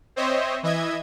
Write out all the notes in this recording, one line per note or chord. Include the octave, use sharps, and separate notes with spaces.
C4 C5 C#5 D#5 E5
E3 D#5 E5 G#6